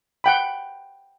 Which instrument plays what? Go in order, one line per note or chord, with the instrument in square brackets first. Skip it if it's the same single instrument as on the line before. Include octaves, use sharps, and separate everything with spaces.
[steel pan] F#5 G5 B5